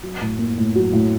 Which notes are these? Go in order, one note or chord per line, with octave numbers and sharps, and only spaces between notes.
F#3
A2
A#3
A2
F#3
A2